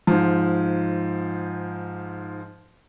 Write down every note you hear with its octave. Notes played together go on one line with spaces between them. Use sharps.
G#2 F3